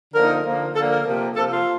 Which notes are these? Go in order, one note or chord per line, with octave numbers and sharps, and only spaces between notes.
D3 F3 A#3 D#4 A#4
D3 F3 A#3
D3 F3 A#3 A4
A#4
C3 F3 A#3
C3 F3 A#3 A4
F4